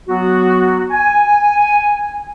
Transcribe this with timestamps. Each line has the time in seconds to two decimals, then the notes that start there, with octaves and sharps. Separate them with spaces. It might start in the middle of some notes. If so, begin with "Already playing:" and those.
0.08 F#3 B3 F#4
0.91 G#5